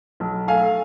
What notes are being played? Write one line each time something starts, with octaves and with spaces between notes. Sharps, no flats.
B1
A3 F5 G#5